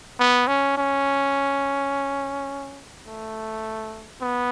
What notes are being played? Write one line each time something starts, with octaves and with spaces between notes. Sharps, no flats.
B3
C#4
C#4
A3
B3